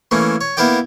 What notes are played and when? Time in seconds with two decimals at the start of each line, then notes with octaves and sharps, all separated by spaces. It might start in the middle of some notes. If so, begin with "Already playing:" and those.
0.11 E3 A3 A#3 C#4
0.41 C#5
0.57 A#3 B3 E4 A#4 D5 G5